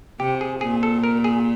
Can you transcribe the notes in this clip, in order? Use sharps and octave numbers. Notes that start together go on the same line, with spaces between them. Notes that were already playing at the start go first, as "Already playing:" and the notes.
C3 G4
G#4
A#2 G#4
A4
A#4
G#4